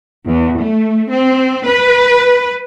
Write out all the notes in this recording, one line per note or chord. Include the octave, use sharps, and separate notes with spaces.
E2
A3
C4
B4